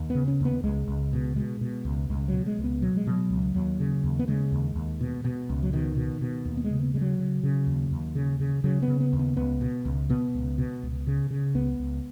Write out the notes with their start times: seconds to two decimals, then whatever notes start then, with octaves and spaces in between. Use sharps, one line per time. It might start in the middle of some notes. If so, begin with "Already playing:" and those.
Already playing: D#2
0.10 C#3 B3
0.28 C#4
0.40 D#2 B3
0.63 C#2 G#3
0.88 C#2
1.13 B2
1.36 B2 G#3
1.61 B2
1.85 C#2
2.09 C#2 G#3
2.28 B2 F#3
2.46 G#3
2.59 C#2
2.64 B3
2.82 B2 F#3
2.96 G#3
3.07 B2 F#3
3.30 C#2
3.54 D#2 F#3
3.79 C#3
4.04 D#2
4.19 B3
4.28 C#3 G#3
4.52 D#2
4.76 D#2
5.01 B2
5.25 B2
5.49 C#2
5.63 F#3
5.73 B2 D#3
5.97 B2
6.21 B2
6.45 D#2
6.57 B3
6.64 G#3
6.70 C#3
6.83 B3
6.94 C#3 G#3
7.01 F#3
7.19 C#3
7.43 C#3
7.67 D#2
7.91 D#2
8.15 C#3
8.40 C#3
8.64 C#3 F#3
8.82 B3
8.88 C#3
9.00 B3
9.13 D#2
9.19 B3
9.37 C#2 B3
9.61 B2
9.85 C#2
10.09 B2 B3
10.34 C#2
10.58 B2
10.83 C#2
11.07 C#3
11.30 C#3
11.54 C#2 B3
11.79 C#2